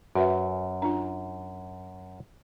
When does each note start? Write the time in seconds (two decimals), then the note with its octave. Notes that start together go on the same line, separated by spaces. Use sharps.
0.15 F#2 F#4 B4 E5
0.82 D4 F4